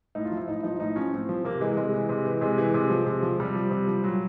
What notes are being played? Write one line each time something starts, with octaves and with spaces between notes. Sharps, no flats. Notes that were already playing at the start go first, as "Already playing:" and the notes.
A2 D#4
F4
F3
E4
A2 D#4
F3 D#4
A2 D#4
F3 C#4
A2 C4
F3
C3 A#3
E3 G#3
C3 G#3
E3
C3
E3
C3 G#3
E3
C3
F3
C3
F3
C3 G3
F3
C3
F3
A#2 F#3